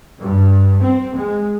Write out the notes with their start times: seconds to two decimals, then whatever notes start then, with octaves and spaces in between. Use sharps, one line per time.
0.20 G2
0.82 C4
1.16 G#3